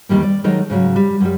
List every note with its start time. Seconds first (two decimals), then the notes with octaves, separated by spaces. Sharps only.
0.09 E2 G2 D#3 G3 A#3
0.23 D5
0.44 D#3 F#3 G#3 D#4 A4 A#4
0.70 G#2 C#3 F3 F#3
0.96 G3
1.20 F#2 G3